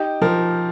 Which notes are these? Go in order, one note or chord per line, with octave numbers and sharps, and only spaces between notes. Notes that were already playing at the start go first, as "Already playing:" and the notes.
Already playing: D#4 G4
F3 A#4